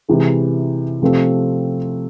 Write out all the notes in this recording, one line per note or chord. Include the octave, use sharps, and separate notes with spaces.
C3 E3 G#3
C3 F3 A3 C4